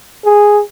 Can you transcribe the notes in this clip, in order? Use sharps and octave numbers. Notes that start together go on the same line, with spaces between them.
G#4